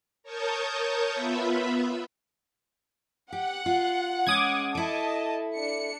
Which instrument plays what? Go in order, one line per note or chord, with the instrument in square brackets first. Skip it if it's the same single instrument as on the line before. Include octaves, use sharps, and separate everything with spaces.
[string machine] A#4 C#5 A5 C#6 D#6 G6
B3 F4 E5 B5
[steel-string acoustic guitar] G4 [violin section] F#5
[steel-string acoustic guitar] F4
[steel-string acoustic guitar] G#3 C#4 [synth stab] D6 D#6 G#6
[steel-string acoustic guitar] E4 A4 [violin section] D#5 A5
[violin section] D4 C#7